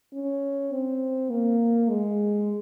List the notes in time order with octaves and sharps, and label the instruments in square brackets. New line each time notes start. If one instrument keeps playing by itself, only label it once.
[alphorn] C#4
C4
A#3
G#3